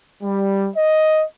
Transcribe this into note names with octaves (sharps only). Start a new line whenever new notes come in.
G3
D#5